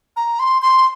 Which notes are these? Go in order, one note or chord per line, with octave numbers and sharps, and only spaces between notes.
A#5
C6
C6